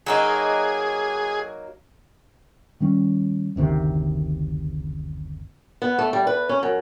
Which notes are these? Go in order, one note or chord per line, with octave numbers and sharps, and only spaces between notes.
F#3 A#3 D#4 G#4
D#3 G3 C#4
F#1 D2 C3 D#3
B3
A3
G3
B4
C#4
F#2